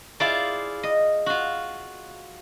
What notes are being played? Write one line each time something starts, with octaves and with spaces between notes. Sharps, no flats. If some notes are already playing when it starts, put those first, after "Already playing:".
E4 F4 G#4 C5 D5
D#5
F4 F#4